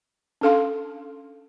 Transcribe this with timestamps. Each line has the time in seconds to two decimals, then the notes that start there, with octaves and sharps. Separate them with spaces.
0.41 C#4 D4 A4 F5 C6